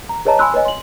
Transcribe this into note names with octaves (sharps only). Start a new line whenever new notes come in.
A#5
G#4 B4 C#5 D#5 A5 A#5
G#5 B5 C6 E6 F#6
B4 C#5 D#5 G#5
C6 F#7